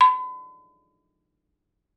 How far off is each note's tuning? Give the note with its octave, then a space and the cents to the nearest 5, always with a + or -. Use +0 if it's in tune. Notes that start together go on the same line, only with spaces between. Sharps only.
B5 +45